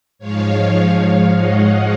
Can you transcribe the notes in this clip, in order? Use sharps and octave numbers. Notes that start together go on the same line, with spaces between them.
G#2 F3 G#3 C#5 F5
D#5 F#5